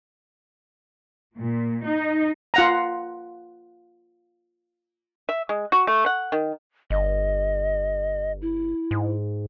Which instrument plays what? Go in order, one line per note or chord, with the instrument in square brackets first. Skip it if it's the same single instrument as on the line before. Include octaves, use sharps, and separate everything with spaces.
[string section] A#2
D#4
[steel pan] F4 F#5 A#5
[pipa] E5
G#3
F#4
A3
F#5
D#3
[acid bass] G1 [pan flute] D#5
[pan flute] E4
[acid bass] G#2